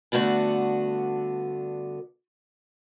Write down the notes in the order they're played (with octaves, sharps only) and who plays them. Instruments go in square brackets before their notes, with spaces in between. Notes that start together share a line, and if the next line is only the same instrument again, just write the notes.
[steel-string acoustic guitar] G2 D3 A3 B3 F#4 F#5